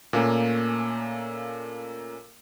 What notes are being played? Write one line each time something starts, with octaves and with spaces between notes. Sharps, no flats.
A#2 A3 A#3 C#4